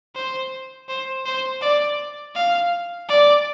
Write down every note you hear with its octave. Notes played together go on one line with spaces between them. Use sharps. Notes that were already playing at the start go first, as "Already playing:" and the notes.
C5
C5
C5
D5
F5
D5